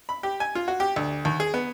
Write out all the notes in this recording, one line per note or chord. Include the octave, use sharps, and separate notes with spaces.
B5
G4
G#5
F4
F#4
G4
D2
D#2
G#4
B3